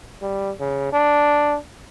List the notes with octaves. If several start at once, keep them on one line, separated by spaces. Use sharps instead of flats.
G3
C#3
D4